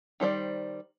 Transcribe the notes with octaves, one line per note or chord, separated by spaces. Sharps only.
D#3 G3 C5 D5